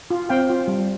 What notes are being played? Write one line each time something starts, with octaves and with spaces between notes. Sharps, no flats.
F4
C4 F5 G5
F4
G3